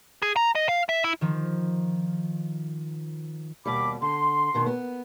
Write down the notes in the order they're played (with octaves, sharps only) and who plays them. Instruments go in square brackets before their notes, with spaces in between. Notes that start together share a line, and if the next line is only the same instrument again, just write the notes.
[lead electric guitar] G#4
A#5
D#5
F5
E5
E4
[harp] D#3 F3
[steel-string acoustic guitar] D#2 B2 G3 [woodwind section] B5 D6
[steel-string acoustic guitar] D3 [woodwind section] C6
[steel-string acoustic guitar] B2 D#3 B3
B3